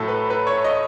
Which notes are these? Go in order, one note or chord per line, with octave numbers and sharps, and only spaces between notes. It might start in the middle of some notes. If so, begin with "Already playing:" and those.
Already playing: A2 F#3 A3 A4
B4
B4
C#5
D#5